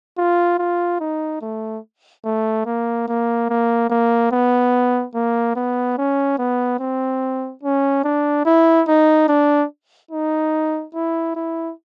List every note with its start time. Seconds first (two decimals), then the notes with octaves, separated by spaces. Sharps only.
0.18 F4
0.59 F4
1.00 D#4
1.41 A3
2.25 A3
2.66 A#3
3.08 A#3
3.49 A#3
3.90 A#3
4.31 B3
5.15 A#3
5.56 B3
5.98 C#4
6.38 B3
6.79 C4
7.63 C#4
8.04 D4
8.45 E4
8.88 D#4
9.28 D4
10.11 D#4
10.94 E4
11.35 E4